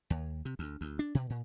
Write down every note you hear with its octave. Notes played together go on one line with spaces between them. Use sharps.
D#2
C3
D2
D2
D4
B2
A#2